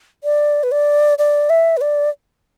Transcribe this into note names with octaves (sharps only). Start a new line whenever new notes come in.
D5
B4
D5
D5
E5
B4
D5